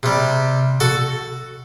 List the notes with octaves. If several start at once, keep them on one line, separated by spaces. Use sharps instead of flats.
C3 G3
F#4 A4